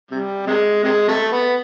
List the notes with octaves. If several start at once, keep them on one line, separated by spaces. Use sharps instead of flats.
C3 G3
C3 G#3
C3 G#3
C3 A3
B3